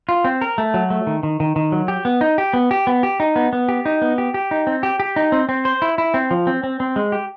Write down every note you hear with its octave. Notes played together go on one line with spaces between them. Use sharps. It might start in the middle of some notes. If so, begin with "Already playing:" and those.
F4
C4
A#4
A3
F#3
A3
D#3
D#3
D#3
D#3
F#3
G4
B3
D#4
G4
B3
G4
B3
G4
D#4
B3
B3
G4
D#4
B3
G4
G4
D#4
C4
G4
G4
D#4
C4
C4
C5
E4
E4
C4
F3
C4
C4
C4
G#3
G4